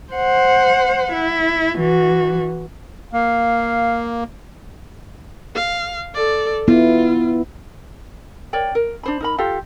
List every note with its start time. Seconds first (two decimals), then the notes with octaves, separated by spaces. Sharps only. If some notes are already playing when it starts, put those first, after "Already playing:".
0.12 C5 F#5
1.12 E4
1.78 E3 F#4
3.13 A#3 F5
5.55 F5
6.14 A4 D5
6.68 B3 E4 F4
8.53 A#4 C#5 D5 G5
8.75 A#4
9.03 D4 C5 B5
9.20 D#4 A#4 B5
9.38 F4 G4 A4 F5